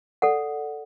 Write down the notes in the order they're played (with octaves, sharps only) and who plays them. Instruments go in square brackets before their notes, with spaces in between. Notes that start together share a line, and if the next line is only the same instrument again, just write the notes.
[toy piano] A4 D5 F#5